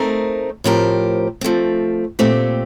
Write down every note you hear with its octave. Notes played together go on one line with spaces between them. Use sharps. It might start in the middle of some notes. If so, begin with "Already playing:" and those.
Already playing: A3 C4 D#4 A#4
A2 F3 C4 G4 A#4
F3 A3 C4
A#2 A3 C4 G4